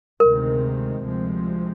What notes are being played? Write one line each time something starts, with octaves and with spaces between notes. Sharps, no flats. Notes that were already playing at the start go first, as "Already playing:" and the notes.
D2 C3 D#3 G#3 C4 A#4
D2 C3 F3 G#3 C4